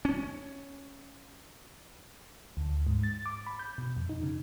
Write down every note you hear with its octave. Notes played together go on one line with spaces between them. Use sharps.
C#4
D2
G#2
A6
D6
B5
G6
B2
F2
D#4
C#3